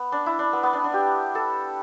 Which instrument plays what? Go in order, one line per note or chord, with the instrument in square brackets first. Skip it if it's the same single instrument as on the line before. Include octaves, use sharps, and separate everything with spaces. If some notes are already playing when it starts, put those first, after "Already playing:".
Already playing: [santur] B3
D4
E4
D4
B3
B3
D4
D4
G4
A4